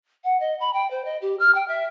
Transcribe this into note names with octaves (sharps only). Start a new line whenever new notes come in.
F#5
D#5
B5
G5
C5
D#5
G4
F6
G5
E5